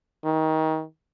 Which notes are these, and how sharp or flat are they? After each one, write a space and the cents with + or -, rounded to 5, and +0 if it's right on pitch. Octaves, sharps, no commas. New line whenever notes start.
D#3 +25